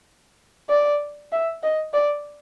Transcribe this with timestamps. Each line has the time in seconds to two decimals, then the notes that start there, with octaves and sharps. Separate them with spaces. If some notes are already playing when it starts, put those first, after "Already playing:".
0.70 D5
1.32 E5
1.63 D#5
1.93 D5